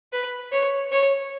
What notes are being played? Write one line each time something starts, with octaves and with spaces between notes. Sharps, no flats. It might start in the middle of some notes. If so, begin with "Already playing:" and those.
B4
C#5
C#5